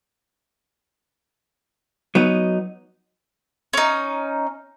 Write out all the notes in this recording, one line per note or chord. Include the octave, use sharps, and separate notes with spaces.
F#3 B3 D#4
C#4 D#4